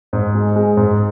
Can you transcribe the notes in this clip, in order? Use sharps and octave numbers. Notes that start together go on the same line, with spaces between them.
G#2
G#3
G#3
G#2